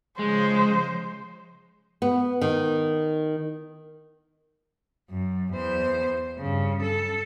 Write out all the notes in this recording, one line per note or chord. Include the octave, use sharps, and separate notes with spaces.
C#3 F3 G#3 C5
B3
D#3
F#2
E2 C5
G2 C#3
A4